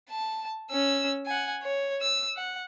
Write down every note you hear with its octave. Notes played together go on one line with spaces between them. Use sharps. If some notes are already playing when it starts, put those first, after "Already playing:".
A5
C#4 E6
F#5 G#5
C#5
E6
F#5